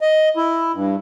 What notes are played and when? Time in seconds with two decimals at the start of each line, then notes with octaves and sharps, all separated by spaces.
0.01 D#5
0.37 E4
0.74 G2